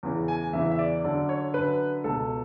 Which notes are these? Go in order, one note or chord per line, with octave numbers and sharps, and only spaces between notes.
E2 C#3 E3
G#5
E2 C#3 E3 E5
E5
D5
F#2 D3 D5
C#5
F#2 D3 B4
C#2 B2 A4